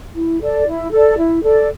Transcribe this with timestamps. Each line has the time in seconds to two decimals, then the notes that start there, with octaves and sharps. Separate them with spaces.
0.15 E4
0.41 A4 D5
0.66 E4
0.92 A4 D5
1.17 E4
1.42 A4 D5